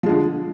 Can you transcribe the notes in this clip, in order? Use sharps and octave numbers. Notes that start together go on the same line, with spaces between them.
D3 F3 G#3